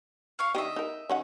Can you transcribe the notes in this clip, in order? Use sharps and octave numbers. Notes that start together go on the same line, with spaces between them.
F5 C#6 F6
D#3 D4 G4 D#5 E5
D#4 A#4
D#3 C#4 F#5